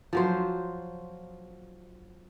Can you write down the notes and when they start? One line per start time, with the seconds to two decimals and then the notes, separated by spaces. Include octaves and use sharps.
0.13 F3 F#3 C5